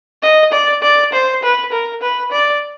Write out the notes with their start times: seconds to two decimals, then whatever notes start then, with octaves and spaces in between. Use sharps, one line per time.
0.23 D#5
0.52 D5
0.83 D5
1.13 C5
1.43 B4
1.73 A#4
2.02 B4
2.32 D5